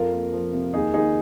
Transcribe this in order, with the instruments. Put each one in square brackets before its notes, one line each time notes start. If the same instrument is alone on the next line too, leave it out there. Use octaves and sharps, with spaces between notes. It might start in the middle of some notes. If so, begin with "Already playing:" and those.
Already playing: [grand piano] F2 F4 A#4
A#3
F3
C3
D#2 D#4 G#4
D#2 D#4 G#4